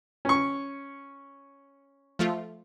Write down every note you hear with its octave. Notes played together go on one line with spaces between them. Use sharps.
C#4 C#6
F3 A3 F4